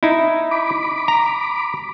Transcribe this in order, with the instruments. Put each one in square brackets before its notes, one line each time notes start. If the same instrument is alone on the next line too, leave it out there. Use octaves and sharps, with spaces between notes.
[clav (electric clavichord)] D#4 E4
[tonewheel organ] B5 D6
[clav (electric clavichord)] A#5